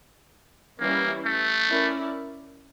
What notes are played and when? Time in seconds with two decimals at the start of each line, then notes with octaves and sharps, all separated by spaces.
0.80 E3 G3 A#3 C#4 E4
1.25 A3
1.69 C#4 E4 A#4 D5